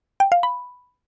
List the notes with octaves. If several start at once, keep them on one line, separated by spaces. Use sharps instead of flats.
G5
F5
B5